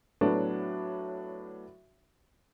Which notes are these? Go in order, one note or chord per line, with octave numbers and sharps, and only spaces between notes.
A2 F#3 B3 D4 F#4